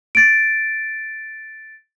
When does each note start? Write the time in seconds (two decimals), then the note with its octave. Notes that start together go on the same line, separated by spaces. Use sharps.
0.15 A6 D7